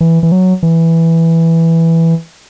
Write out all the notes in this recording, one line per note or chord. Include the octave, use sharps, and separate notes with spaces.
E3
E3
F#3
E3